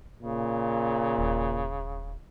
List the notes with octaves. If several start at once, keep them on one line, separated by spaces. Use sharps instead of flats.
A#2 C#3
D#1